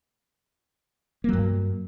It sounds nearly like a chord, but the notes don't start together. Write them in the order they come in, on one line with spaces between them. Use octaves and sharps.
A#3 F#3 G2